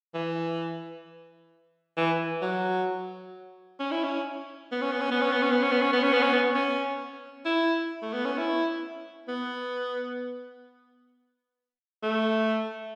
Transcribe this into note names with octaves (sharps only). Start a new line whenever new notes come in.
E3
E3
F#3
C#4
E4
C#4
B3
C#4
B3
C#4
B3
C#4
B3
C#4
B3
C#4
B3
C#4
B3
C#4
B3
C#4
B3
C#4
E4
A3
B3
C#4
E4
B3
A3